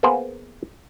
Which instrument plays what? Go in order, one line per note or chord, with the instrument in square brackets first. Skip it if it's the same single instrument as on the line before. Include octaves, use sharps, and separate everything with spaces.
[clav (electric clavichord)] A#3 B3 G#4 B4 C5